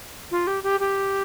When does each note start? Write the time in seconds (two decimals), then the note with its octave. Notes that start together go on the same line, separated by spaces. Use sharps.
0.31 F4
0.47 G4
0.63 G4
0.80 G4